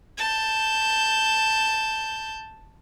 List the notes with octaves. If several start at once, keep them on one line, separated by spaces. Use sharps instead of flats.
A5 G6